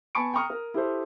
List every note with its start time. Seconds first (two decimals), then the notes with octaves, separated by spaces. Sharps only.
0.15 B3 G#5 A5 B5 C#6 D7
0.34 G5 A#5 C#6 D#6 F6
0.50 A#4
0.74 E4 G4 A4 C5